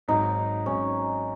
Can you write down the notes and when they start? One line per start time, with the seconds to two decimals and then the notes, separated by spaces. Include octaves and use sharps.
0.08 G#1 G#2 F#3 D#4
0.66 G#1 G#2 F#3 C#4